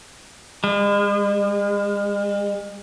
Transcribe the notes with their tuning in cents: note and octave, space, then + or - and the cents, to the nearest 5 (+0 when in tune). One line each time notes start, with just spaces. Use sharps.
G#3 -40